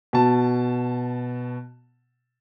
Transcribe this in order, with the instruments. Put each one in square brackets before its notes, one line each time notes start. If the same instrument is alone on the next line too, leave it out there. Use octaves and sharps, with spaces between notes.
[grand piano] B2 A5